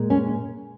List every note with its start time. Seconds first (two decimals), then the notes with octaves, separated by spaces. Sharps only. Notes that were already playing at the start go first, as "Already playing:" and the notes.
Already playing: A#2 G#3
0.10 C#4